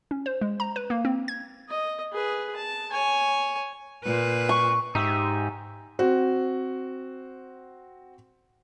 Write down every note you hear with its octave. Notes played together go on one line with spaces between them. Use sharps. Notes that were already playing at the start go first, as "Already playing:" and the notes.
C#4
C5
G#3
A#5
B4
A#3
C4
G#6
D#5
G#4 B4
A5
C#5 G#5
A#2 B4
C#6
G#2 D#4 G4 E5
C4 F#4